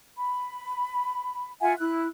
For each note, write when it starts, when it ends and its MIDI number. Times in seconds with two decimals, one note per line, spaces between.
0.17 1.50 83
1.61 1.74 65
1.61 1.74 76
1.61 1.74 78
1.61 1.74 80
1.79 2.07 64
1.79 2.07 90